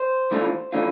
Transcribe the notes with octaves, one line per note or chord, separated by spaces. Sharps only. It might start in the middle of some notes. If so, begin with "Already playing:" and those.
Already playing: C5
E3 A3 D4 F4
E3 A3 D4 F4